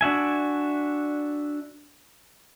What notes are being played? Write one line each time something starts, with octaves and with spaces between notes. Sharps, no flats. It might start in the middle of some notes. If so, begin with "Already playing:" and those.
D4 F#4 E5 G#5